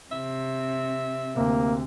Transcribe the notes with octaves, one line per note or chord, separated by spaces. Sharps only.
C3 C4 E5
D2 C3 A#3